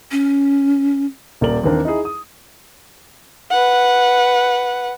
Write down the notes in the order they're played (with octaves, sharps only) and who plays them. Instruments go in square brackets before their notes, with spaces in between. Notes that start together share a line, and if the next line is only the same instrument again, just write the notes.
[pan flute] C#4
[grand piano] D#1 A#2 A#4 D5 F#7
D#2 D#3 E3 A#3 C4 D4
D#4 E4 G#4
D#6
[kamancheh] B4 F#5